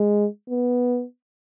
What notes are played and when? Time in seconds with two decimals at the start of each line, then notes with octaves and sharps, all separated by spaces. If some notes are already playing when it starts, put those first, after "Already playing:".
Already playing: G#3
0.49 B3